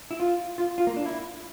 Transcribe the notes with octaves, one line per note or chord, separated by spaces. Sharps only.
E4
F4
F4
F4
A#3
D4
E4